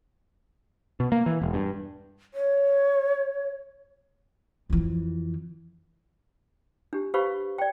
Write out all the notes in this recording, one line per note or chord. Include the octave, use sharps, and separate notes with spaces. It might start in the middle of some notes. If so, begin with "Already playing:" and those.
B2
A#3
E3
E1
G2
C#5
F2 E3
D4 G4
G4 B4 C5 F5 B5 C#6
D5 G5